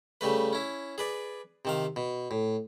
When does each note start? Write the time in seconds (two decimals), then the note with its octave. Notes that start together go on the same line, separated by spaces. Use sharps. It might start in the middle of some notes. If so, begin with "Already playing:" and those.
0.21 C#3 G3 A3 B4
0.53 C#4 E4
0.98 G#4 B4 D5
1.65 C3 D#3 F5
1.96 B2
2.31 A2